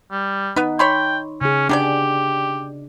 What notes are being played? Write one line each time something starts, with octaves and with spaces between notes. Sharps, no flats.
G3
B3 D#4 B4
C#5 G5 B5 C6
C#3 C#4 G#4
B2 D4 G4 G#4 D5